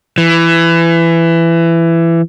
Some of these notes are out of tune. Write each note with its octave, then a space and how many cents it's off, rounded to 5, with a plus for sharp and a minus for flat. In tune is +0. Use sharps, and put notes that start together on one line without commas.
E3 +20